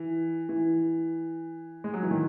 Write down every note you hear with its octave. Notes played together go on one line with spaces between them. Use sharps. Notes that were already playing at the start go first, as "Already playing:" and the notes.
Already playing: E3
E3
G#3
F#3
E3
D#3